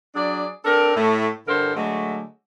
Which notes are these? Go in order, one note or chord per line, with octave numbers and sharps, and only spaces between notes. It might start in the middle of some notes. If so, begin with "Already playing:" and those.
F#3 D4 G#4 D5
C4 D4 A4 A#4
A2 A3
G2 D3 E3 A4 A#4 C5
D3 F#3 G#3 A3